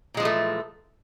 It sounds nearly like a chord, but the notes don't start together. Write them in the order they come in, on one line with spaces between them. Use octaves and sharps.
A#2 G#3 F3 E3 A3